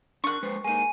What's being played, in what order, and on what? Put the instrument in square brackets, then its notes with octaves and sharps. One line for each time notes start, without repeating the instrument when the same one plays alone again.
[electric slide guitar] D4 A#4 [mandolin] C#6 F#6
[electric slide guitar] G#3 B4 C5
[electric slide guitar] G#3 A#3 D#4 [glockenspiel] G#5 D#7